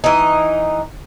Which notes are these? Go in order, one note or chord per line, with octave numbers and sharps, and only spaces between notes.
E3 D#4